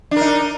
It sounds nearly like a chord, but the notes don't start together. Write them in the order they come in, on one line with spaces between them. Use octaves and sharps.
D4 A#4 D#4